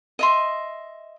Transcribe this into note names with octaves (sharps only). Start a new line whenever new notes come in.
D#5 E5 C6